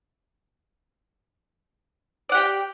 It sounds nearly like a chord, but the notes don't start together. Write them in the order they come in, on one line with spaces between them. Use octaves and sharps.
D5 F#5 G4 G5